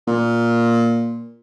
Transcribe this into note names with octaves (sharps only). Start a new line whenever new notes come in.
A#2